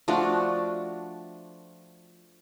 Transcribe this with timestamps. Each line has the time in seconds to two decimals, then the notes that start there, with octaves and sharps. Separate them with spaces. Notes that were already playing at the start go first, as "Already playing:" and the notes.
0.08 F3 A3 D4 F#4